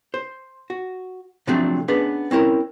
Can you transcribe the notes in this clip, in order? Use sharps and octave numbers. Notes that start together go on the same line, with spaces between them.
C5
F#4
C3 F3 F#3 A3 C4 D4
B3 C#4 D4 G#4 B4
C4 C#4 E4 A#4